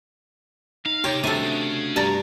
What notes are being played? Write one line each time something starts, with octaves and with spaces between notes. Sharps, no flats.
D#4 F5
C3 G4 C#5
C3 D#3 G3 A3 D4 F#4 A4 G#5
C#3
G2 A5 A#5